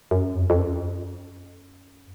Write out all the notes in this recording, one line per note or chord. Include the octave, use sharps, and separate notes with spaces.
F#2
F2
F2
F#2